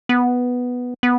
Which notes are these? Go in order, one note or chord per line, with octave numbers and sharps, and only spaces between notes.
B3
B3